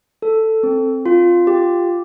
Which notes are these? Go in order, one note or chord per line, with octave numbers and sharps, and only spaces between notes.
A4
C4
F4
G4